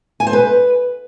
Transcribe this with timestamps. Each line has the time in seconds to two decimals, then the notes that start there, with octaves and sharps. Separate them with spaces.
0.20 G#5
0.27 C5
0.33 B4